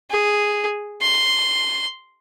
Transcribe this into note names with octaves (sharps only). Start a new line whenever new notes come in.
G#4
C6